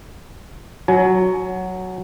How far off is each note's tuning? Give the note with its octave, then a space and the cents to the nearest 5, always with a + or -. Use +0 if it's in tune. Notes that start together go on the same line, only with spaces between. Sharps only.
F#3 +0 G#5 +35